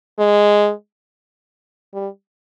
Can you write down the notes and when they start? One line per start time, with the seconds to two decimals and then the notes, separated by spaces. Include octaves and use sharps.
0.19 G#3
1.94 G3